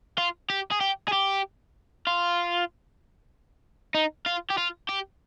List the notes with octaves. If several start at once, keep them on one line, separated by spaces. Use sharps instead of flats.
F4
G4
G#4
G4
G#4
G4
F4
D#4
F4
G4
F4
G4